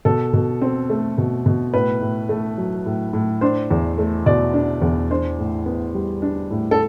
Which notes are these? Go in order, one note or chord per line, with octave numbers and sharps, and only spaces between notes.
B2 A4
B2
C4
A3
B2
B2
A2 B4
A2
A3
F#3
A2
A2
D4 C5
E2
A3
B2 D5
D4
E2
D4 C5
A2
B3
G3
D4
A2
A4